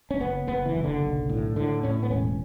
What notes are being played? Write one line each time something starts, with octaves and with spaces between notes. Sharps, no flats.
C#4
F#1 B3
F#1 B3
E3
F#1
D3
B1
A2
A2 D3
A2 C#4
B3
E1 C#4